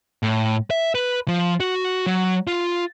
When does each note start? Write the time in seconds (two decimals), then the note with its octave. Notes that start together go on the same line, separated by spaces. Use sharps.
0.23 A2
0.70 E5
0.95 B4
1.28 F3
1.60 F#4
2.07 F#3
2.47 F4